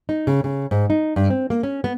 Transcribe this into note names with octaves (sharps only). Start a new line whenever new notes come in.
D#4
C#3
C#3
G#2
D#4
G2
C4
A#3
C#4
B3